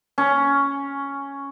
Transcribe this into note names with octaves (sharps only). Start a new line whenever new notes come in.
C#4